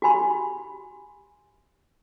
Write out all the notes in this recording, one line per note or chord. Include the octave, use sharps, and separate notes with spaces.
F#4 G4 G#5 B5 C6